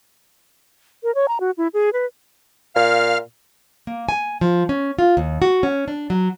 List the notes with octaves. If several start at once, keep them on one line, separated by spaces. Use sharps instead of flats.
A#4
C#5
A#5
F#4
E4
G#4
B4
A#2 F5 F6
A#3
G#5
F3
C#4
F4
D#2
F#4
C#4
D4
F#3